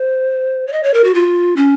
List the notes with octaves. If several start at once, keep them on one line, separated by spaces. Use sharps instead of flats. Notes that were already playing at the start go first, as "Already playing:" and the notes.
Already playing: C5
C#5
D#5
C#5
A#4
F#4
F4
C#4